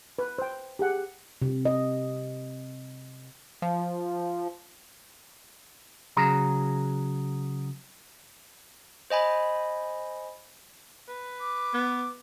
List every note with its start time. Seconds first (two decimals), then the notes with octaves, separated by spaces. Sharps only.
0.19 B4
0.38 C5 G5
0.79 G4 G#4 F#5
1.42 C3
1.65 D#5
3.62 F3
6.17 C#3 F#3 G#4 A#5
9.10 C5 D#5 G#5 B5
11.08 B4
11.40 D6
11.74 B3